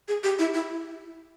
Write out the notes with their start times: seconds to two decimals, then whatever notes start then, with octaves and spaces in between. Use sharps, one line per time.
0.08 G#4
0.23 G4
0.39 E4
0.54 E4